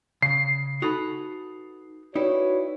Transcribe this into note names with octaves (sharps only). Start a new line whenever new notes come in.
C#3 C7
D#4 F#4 A4 B4 D#6 F7
D#4 E4 F#4 G4 B4 C#5 D5